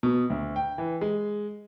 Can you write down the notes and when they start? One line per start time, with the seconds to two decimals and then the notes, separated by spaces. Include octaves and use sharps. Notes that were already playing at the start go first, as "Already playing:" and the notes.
0.03 B2
0.30 D2
0.56 G5
0.78 E3
1.01 G#3